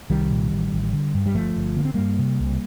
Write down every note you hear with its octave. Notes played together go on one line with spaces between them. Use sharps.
C2 D#3 G3
A#2
A1
A1
D3
G2
G3
G1 F3 A3
G1
D3 A#3
C4
G2 G3 A#3
C3
C2